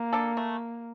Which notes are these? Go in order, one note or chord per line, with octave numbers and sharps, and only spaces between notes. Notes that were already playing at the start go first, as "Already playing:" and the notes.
Already playing: A#3
D4 A4
A3